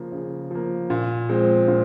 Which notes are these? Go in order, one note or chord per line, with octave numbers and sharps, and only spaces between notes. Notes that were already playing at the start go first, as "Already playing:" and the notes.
Already playing: C#3 F3 A#3
C#3
F3 A#3
A#2
F3 G#3 C4
A#2